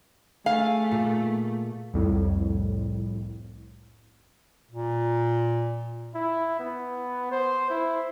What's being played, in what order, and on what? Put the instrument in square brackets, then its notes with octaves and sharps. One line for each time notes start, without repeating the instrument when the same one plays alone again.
[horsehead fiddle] A3 [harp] G#4 [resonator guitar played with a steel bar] F5
[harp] A#2
[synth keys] C2 F2 A2
[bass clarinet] A#2
[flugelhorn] E4
B3
C5
E4